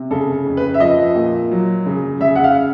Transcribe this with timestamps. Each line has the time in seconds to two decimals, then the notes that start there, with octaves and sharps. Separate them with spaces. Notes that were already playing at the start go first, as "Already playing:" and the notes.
Already playing: C3
0.11 C#3 A4
0.46 F2
0.57 B4
0.74 E5
0.80 F3 D#5
1.16 A#2
1.51 F#3
1.86 C#3
2.21 C#3 E5
2.36 F#5
2.44 F5